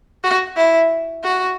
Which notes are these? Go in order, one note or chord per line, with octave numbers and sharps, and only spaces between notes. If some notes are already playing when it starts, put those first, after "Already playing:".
F#4
E4
F#4